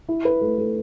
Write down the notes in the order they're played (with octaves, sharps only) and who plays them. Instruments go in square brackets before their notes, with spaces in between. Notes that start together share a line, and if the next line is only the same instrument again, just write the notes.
[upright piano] E4
B4
A3
A3